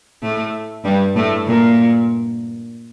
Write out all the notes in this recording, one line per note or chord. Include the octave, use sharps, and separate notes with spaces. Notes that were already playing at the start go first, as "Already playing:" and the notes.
A2 A3
G2 G3
A2 A3
A#2 A#3